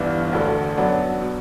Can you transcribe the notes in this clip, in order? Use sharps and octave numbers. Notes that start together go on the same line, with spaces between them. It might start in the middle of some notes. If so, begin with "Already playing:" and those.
Already playing: G1 G2 E3 B3 D4
E1 D2 D3
F#2 F#3 B3 D4
B2